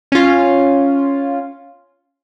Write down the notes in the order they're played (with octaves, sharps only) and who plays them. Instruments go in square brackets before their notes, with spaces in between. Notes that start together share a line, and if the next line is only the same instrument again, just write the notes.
[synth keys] C#4 F4